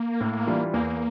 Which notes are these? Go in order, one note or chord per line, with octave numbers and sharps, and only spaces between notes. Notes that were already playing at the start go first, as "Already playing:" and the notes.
Already playing: A#3
A2
E3 G3 D4 F4
E2 A#3